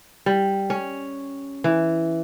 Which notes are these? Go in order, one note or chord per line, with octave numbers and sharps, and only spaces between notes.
G3
C#4
E3